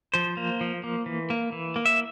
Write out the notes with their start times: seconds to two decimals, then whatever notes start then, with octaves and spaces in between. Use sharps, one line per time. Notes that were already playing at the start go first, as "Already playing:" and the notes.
0.14 F3 C5
0.37 A#3
0.61 F3
0.84 A#3
1.06 E3
1.30 A#3
1.52 E3
1.76 A#3
1.86 E5